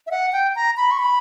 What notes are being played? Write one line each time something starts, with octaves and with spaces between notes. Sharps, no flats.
E5
F#5
G5
A#5
B5
C#6
B5